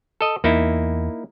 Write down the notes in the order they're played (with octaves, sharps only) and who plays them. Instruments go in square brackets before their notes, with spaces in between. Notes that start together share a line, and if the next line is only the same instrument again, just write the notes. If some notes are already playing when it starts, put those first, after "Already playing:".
[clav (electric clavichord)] A4 D#5
[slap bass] E2 [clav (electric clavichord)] A#3 D#4 E4